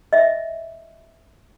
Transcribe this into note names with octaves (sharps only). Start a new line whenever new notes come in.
D#5 E5